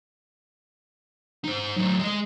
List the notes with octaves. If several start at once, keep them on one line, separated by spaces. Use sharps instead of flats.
D#4 C5
A2 F#3
G#3 D#5